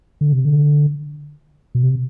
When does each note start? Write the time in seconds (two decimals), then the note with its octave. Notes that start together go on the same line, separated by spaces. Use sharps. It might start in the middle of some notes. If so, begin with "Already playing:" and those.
0.21 D3
0.33 C3
0.45 D3
1.75 B2
1.83 C3